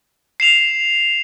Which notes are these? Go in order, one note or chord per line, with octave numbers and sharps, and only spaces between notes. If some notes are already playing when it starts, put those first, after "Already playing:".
C7 E7 F7